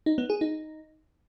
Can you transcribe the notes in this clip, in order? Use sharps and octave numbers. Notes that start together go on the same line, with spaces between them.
D#4
B3
G#4
D#4